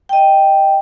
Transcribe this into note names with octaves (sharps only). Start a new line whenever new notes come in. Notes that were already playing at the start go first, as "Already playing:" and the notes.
D#5 G5